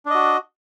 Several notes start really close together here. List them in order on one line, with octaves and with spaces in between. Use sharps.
D4 D#5 F#4